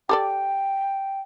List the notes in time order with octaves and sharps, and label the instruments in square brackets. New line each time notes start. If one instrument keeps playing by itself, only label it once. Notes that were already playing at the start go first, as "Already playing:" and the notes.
[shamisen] G4 A4 D5 [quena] G5